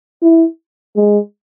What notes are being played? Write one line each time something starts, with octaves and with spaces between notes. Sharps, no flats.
E4
G#3